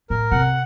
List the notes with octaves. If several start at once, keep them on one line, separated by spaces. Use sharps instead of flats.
A2 A#4
C3 F#5